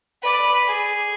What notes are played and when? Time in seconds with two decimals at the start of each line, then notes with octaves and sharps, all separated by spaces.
0.22 B4 D5
0.67 G#4